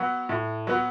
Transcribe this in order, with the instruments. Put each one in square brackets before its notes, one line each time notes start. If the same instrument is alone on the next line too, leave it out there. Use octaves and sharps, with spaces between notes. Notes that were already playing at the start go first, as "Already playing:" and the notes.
Already playing: [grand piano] F#3 B3 F#4
A2
F#3 B3 F#4